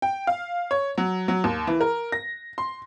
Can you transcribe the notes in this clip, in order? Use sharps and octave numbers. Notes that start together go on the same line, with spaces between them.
G5
F5
C#5
F#3
F#3
D#2
E3
A#4
A#6
C6